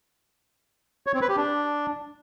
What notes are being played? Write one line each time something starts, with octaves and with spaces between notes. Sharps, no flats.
C#5
C4
B4
G4
D4